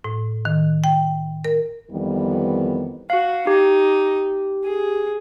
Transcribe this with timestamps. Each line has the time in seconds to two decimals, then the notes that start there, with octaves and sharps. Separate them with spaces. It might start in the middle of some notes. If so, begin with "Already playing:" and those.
0.04 A2
0.45 D#3
0.84 G5
1.45 A#4
1.92 F2 D#3 E3 G3 B3
3.10 F#4 F5
3.47 D#4 G4
4.64 G#4